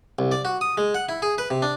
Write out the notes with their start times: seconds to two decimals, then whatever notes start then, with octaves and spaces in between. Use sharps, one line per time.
0.19 C2
0.32 D5
0.45 F#4
0.61 D#6
0.77 G#3
0.95 F#5
1.09 E4
1.22 G#4
1.38 B4
1.51 C3
1.62 D4